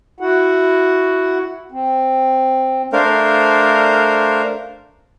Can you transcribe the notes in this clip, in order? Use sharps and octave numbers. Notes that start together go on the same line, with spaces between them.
E4 F#4 F#5
C4
A3 D4 A#4 C5 F5